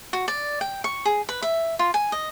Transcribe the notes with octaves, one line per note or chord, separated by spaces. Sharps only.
F#4
D5
G5
C#6
G#4
B4
E5
F4
G#5
D#5